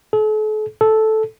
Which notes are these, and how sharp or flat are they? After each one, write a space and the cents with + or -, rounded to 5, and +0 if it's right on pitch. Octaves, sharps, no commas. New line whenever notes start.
A4 -45
A4 -10